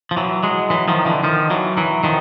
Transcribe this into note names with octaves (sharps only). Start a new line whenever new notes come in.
F3
E3 F#3
F#3 G#3
E3 F#3
D#3 F3
D3 E3
D#3 F3
E3 F#3
E3 F#3
D#3 F3